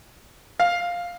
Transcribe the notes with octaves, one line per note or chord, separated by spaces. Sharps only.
F5